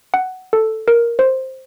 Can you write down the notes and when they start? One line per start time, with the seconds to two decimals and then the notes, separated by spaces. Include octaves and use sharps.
0.14 F#5
0.53 A4
0.88 A#4
1.19 C5